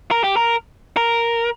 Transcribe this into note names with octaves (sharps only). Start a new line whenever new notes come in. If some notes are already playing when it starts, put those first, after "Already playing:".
A#4
G4
A#4
A#4